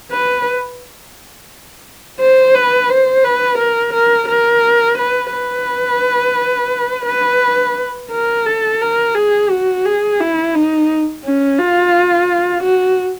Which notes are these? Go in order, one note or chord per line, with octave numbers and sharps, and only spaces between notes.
B4
C5
B4
C5
B4
A#4
A#4
A#4
B4
B4
B4
A#4
A4
A#4
G#4
F#4
G#4
E4
D#4
C#4
F4
F#4